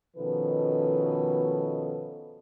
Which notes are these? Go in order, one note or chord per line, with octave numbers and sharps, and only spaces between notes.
B2 D#3 F3 C#4 A4 B4